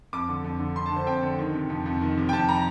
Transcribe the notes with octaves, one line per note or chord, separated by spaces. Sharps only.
F2 D6
D3
F2
D3
F2 C6
A5
D3 C5
F2 G5
D3
D#3
C3
F2
F2
D#3
C3
G5
F2 A5
A#5